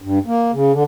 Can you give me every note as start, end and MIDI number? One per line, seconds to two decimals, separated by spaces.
0.02 0.19 43
0.26 0.52 58
0.53 0.72 49
0.72 0.83 50